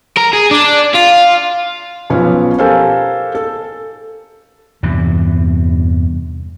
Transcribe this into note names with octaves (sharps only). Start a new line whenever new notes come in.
A#4
G#4
D4
F4
B1 F3 C#4 B4 C#5 G#5
G4 A4 A#4 C5 F5 G#5
A4
E2 G2 C3